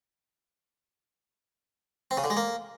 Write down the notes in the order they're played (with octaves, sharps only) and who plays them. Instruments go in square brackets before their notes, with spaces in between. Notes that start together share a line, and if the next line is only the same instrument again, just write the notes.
[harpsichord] C4
C#3
D3
G#3
A#3